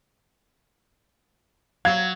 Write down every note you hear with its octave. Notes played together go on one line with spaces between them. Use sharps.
F#3 F5 G#6